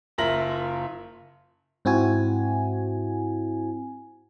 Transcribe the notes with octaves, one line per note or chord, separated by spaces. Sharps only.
F#1 F4 A#4 E5 A#6 F#7
G#2 C4 E4 F#4 G#5